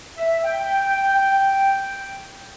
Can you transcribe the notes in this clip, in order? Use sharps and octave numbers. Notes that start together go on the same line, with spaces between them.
E5
G5